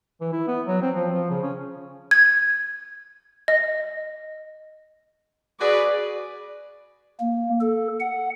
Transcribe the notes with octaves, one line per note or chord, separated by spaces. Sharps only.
E3
E4
B3
F#3
C4
F3
F3
C#3
C#4
G#6
D#5
F#4 G#4 B4 D5
A#3
A4
F#5